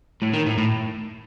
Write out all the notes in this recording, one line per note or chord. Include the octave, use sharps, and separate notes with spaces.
A2
D#3
A2
A2